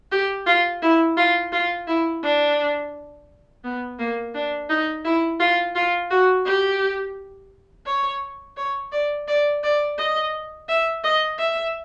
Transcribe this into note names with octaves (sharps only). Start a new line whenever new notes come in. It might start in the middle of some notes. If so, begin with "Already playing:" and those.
G4
F4
E4
F4
F4
E4
D4
B3
A#3
D4
D#4
E4
F4
F4
F#4
G4
C#5
C#5
D5
D5
D5
D#5
E5
D#5
E5